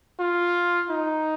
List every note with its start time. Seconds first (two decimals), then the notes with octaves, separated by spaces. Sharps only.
0.20 F4
0.90 D#4